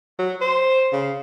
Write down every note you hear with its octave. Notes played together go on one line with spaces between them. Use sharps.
F#3
C5
C#3